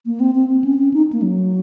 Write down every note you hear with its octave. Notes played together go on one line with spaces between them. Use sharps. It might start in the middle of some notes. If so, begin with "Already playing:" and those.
A#3
C4
C4
C4
C#4
C#4
D#4
A#3
F#3